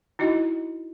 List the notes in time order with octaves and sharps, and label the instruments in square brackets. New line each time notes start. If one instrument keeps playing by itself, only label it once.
[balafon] D#4 E4 F#4 D#5